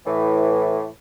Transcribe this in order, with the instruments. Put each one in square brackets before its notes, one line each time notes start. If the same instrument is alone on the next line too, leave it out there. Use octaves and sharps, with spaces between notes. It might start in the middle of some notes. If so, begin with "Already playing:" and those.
[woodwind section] A2 E3